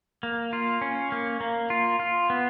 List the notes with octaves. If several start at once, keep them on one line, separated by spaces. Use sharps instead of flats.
A#3
F4
C#4
A#3
A#3
F4
F4
B3